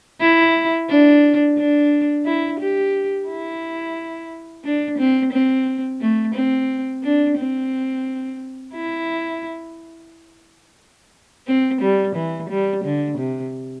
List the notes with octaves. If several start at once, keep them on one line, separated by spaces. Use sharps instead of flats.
E4
D4
D4
E4
G4
E4
D4
C4
C4
A3
C4
D4
C4
E4
C4
G3
E3
G3
D3
C3